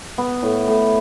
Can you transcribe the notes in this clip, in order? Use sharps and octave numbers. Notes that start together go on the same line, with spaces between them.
B3
A2
A2